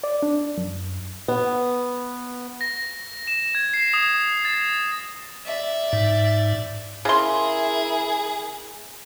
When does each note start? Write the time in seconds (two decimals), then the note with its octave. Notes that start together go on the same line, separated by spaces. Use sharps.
0.04 D5
0.23 D4
0.58 F#2
1.28 B3
2.61 A#6
3.27 E7
3.55 G#6
3.74 C7
3.94 D#6
4.45 A6
5.45 D5 E5
5.93 G#2
7.05 C#3 E4 G#4 A#4 C6